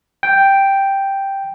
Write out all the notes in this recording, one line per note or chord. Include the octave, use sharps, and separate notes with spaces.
G5